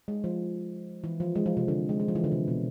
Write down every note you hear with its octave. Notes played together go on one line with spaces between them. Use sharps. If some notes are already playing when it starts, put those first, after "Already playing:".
G#3
F3
E3
F3
G#3
F3
C3
D3
G#3
G#3
F3
E3
D3
C3
B2